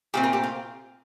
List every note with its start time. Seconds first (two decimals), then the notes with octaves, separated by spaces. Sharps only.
0.14 A#2 A3 C4 G4
0.23 A#4
0.33 G4
0.43 F4